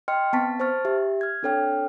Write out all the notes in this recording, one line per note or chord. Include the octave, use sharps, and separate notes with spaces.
D#5 G5 C6 F6 C#7
B3 C4 A5 C#6 A6 B6
C5 A5 C#6 F6 A6
G4 E5
F6 G#6
C4 D4 A4 C#5 G5 F6